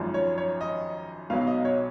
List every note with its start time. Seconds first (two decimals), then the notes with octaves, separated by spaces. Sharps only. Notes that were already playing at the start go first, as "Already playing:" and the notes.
Already playing: G#1 F#2 F3
0.14 C#5
0.38 C#5
0.61 D#5
1.30 B1 B2 F#3 F5
1.41 F5
1.47 D#5
1.65 C#5